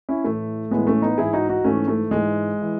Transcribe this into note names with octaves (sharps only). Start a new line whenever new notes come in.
C#4 E4
A2 E3 A3
A2 E3 G#3 B3
A3 C#4
B3 D#4
G#2 E3 E4 G#4
D#4 F#4
D#4 F#4
G#2 E3 A3 C#4
A3
G#2 E3 G#3
E3